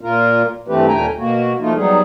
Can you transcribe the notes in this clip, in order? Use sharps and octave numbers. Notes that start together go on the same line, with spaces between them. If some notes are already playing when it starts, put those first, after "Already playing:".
A#2 A#3 F4 A#4
G2 E3 A3 C4 G4 B4
D#2 A#2 A3 G5 G#5 A#5
B2 A#3 F#4
F3 A3 A#3 D#4 F4
F#3 G3 B3 D#4 G#4